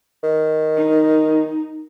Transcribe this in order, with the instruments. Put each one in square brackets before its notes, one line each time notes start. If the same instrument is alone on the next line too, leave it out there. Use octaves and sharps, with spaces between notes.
[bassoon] D#3
[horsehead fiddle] D#4